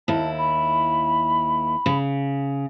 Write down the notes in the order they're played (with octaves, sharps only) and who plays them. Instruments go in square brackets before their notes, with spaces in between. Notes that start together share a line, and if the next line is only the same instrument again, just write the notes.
[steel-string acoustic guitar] D#2 E4 [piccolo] A5
[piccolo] B5
[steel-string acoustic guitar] C#3